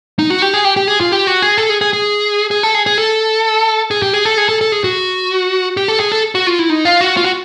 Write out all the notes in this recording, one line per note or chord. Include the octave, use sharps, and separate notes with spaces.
D#4
F#4
G4
G#4
G4
G4
G#4
F4
G4
F#4
G#4
A4
G#4
G#4
G#4
G#4
A4
G#4
G#4
A4
G#4
G4
G#4
A4
G#4
A4
A4
G#4
F#4
G4
A4
G#4
A4
F#4
F4
E4
D#4
F4
F#4
F4
F#4